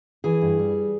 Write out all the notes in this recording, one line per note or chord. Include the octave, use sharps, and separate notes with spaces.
E3 G#4
G2
G3